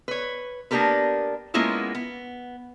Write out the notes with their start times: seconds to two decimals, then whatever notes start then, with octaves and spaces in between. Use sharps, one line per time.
0.08 B4 C#5
0.71 A#3 B3 D4 G4 A#4 B4
1.54 G#3 A#3 B3 C#4 E4 F4
1.95 B3